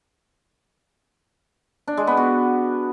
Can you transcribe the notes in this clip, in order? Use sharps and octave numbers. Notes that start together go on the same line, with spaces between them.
D4
G#3
B3
F#4